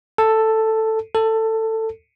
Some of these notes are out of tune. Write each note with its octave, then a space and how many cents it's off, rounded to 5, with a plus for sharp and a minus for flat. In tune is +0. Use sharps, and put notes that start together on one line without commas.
A4 +5
A4 +15